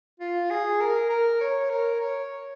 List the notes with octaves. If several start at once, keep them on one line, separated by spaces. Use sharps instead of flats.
F4
G#4
A#4
A#4
C#5
A#4
C#5